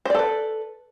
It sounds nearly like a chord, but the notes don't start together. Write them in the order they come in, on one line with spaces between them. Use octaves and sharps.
C5 D5 A4 B4